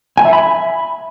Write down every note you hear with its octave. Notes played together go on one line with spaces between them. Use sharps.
G#5
E5
B5